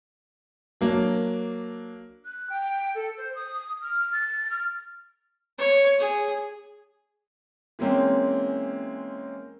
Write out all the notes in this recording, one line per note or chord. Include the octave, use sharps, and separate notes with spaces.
F#3 A#3 D4
F#6
G5
A4
C5
D#6
F6
A6
F6
C#5
G#4
E3 G#3 A#3 C4 C#4